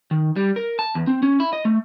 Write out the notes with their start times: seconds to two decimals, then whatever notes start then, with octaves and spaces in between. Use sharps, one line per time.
0.11 D#3
0.36 G3
0.56 A#4
0.79 A5
0.95 E2
1.07 C4
1.23 C#4
1.40 E4
1.53 D#5
1.65 A3